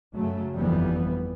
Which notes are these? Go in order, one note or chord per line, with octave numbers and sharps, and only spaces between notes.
F#2 C#3 F#3 A3
G1 F2 E3 G3 B3